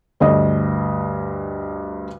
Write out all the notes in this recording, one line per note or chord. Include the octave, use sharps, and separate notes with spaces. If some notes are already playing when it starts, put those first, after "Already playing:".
D2 G2 D#5